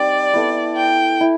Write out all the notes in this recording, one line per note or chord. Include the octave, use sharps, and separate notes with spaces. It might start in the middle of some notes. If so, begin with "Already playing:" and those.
Already playing: G3 C4 D#4 D5
B3 E4 A4
G5
E4